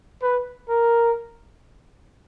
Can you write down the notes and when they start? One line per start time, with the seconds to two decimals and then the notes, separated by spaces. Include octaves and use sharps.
0.23 B4
0.69 A#4